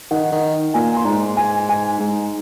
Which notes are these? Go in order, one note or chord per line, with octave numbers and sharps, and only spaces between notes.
D#3 F#5
D#3
A#2 G#5
C6
G#2 A#5
G#5
G#5
G#2